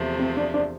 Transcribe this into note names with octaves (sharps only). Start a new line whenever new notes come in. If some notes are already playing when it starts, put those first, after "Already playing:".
Already playing: E2 C3 F3 A3
C4
D4
D4